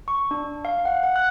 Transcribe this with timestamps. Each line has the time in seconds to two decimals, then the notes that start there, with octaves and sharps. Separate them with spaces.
0.08 C#6
0.31 D4
0.65 F5
0.85 F#5
1.03 F#5
1.16 F#6